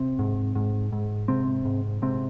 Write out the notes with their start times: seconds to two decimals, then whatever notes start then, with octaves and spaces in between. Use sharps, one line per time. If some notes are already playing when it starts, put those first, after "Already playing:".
Already playing: C3 C4
0.19 G#2
0.55 G#2
0.92 G#2
1.28 G#2 C3 C4
1.65 G#2
2.02 G#2 C3 C4